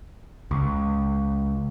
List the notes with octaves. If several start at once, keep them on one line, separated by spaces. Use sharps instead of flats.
C#2